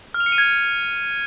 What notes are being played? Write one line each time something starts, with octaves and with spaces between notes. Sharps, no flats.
F6
F7
C#7
D#7
G#6